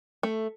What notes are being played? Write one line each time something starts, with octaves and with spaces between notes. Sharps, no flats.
A3